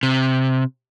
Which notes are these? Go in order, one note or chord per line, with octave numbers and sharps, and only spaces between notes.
C3